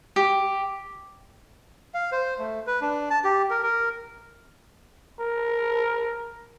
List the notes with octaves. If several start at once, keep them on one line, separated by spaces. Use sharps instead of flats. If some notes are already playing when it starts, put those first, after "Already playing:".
G4
F5
C5
A3
B4
D4
A5
G4
A#4
A#4
A#4